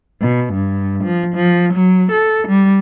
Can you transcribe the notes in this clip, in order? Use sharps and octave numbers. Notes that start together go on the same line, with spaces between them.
B2
G2
F3
F3
F#3
A4
G3